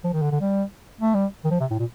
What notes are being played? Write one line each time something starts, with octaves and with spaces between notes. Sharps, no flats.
F3
D#3
D3
D3
G3
A3
G3
D#3
F3
C3
A2
A#2